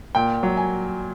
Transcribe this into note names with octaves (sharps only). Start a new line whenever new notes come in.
A#2 G5
F#3
G#5